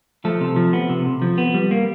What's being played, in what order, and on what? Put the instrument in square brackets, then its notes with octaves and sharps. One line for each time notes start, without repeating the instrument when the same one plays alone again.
[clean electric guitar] F3 A3 A4
C3
F3
B3
C3
C3
F3
B3
G3
A#3